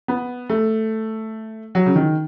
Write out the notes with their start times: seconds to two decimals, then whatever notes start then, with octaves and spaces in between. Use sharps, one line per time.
0.08 B3
0.49 A3
1.75 F#3
1.86 C#3
1.95 D#3